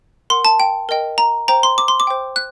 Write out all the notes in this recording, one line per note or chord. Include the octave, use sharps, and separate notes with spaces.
A#4 F#5 C6
A5
G5
A#4 D#5 G5
A#5
C5 G5 A#5
C6
D6
C6
D6
C5 G5
F#6